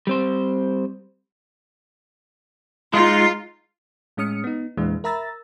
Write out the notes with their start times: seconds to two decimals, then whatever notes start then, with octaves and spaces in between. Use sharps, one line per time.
0.07 G3 C4 C5
2.94 G#3 D#4 F4
4.17 A2 G#3 C#4 D#6 F6 C#7
4.44 B3 D#4
4.77 E2 A#2 E3 G#3 D4
5.04 A#4 E5 A#5 B5 E6 A6